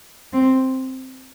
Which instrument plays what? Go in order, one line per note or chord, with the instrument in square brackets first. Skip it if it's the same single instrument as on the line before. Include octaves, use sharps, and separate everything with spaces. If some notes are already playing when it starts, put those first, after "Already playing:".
[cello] C4